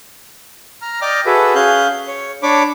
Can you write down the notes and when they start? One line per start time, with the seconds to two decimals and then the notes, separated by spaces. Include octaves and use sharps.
0.82 A#5 F6
1.02 D5 D#5 G5 D6 F6
1.26 F#4 G#4 A4 B4 E5
1.55 C#4 G#4 F5 F#6 G6
2.07 C#5
2.43 D4 C#5 B5 D6